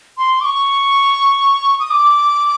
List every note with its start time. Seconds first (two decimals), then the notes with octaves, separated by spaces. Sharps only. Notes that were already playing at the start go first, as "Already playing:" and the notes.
0.18 C6
0.41 D6
0.45 C#6
1.80 D#6
1.91 D6